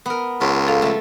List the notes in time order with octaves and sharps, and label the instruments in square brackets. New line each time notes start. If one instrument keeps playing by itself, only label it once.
[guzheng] B3 A#4
[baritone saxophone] C#2 [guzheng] F4
[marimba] A4 F5
[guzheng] F3 A3